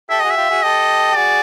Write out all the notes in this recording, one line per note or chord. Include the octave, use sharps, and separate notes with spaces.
G4 A4 E5
F#4 G#4 D#5
E5
F4 G4
F#4 G#4
G4 A4 D#5
G4
F#4 G#4 D5